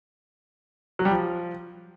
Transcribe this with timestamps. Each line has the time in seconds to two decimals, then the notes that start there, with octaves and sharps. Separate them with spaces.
0.99 F#3
1.05 G3
1.11 F3